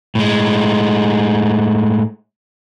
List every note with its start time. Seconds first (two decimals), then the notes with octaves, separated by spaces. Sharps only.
0.15 A2 G#3